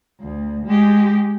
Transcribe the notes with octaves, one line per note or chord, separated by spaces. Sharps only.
D2
G#3 G4